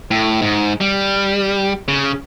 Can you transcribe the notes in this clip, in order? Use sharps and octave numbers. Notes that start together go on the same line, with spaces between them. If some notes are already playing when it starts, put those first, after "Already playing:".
A2
G#2
G3
C#3